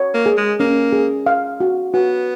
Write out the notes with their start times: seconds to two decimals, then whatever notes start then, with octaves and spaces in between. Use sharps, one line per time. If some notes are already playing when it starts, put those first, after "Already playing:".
Already playing: C#5
0.14 A#3
0.26 G#4
0.37 G#3
0.60 A#3 C#4
0.92 G#4
1.26 F5
1.60 F#4
1.94 B3 F#4